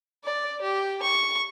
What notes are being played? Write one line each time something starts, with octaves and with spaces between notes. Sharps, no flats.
D5
G4
C#6